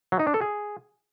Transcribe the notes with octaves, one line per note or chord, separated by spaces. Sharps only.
F#3
D#4
D4
A4
G#4